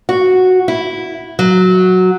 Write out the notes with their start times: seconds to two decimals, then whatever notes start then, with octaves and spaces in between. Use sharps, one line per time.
0.09 F#4
0.68 E4
1.39 F#3